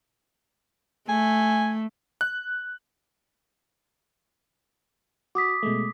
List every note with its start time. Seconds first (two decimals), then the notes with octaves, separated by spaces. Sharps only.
1.09 A3 G#5
2.21 F#6
5.35 F#4 D6 D#6 B6
5.63 B2 G#3 A3